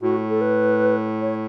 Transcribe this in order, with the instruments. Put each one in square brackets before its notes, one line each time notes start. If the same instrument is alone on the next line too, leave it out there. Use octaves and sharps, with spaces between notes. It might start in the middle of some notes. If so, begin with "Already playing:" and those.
[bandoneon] A2 [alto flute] F#4
[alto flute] A4
B4
C#5